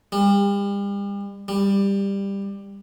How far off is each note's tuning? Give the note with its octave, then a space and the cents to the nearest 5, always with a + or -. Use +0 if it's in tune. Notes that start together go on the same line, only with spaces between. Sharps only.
G3 +40
G3 +15